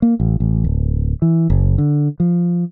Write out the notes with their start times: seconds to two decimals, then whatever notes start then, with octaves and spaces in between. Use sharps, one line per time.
0.02 A#3
0.20 A1
0.40 A1
0.64 D1
1.22 E3
1.50 F#1
1.78 D3
2.20 F3